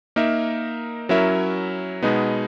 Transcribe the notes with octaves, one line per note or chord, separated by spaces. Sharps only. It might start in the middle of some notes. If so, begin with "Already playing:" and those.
A#3 D#4 A#4 E5
F#3 C#4 E4 A#4 E5
B2 G#3 B3 D#4